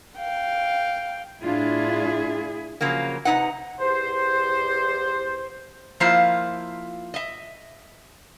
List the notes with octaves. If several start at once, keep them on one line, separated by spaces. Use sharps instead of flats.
F5 G5
A2 D4 E4 F4 G#4
C#3 F3 F#3 A#3
C3 E3 D#4 B4 F#5
E2 G4 C5
F3 A#3 E4 F4 C5 F5
D#5 E5